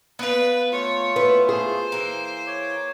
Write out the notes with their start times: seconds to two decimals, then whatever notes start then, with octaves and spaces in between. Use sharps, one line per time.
0.19 B3 B4 F5
0.72 A3 F4 C#5
1.16 B3 E4 B4
1.49 G#4 C5
1.92 E3 A#3
2.47 C#5 D6